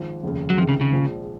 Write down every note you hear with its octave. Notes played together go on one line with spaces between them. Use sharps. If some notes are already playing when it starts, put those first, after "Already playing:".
Already playing: G#1 F3
F1 D#2 C#3
F#3
C#2 C3 D#3 F3
C#3
C#3
A#1 A#2 F3 G#3